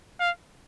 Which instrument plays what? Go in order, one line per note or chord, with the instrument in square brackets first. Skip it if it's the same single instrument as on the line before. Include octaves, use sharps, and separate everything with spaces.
[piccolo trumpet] F5